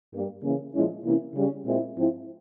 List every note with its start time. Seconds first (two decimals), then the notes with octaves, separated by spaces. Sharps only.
0.12 G2 G3 A#3
0.43 C#3 E3 A#3 C#4
0.73 A#2 F3 G#3 C#4 E4
1.04 C3 E3 A#3 C#4 E4
1.35 C#3 G3 C#4
1.64 A#2 G#3 C4 E4
1.95 G#2 F3 C4 E4